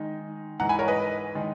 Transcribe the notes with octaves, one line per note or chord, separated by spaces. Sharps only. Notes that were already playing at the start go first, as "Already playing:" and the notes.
Already playing: D#3 G#3 D#4
G#2 E3 G#3 F#5 A#5
G#5 B5
A#4 C#5
B4 D#5
D#3 G#3 D#4